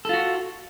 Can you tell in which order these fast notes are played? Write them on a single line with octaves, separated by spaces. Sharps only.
A4 F4 F#4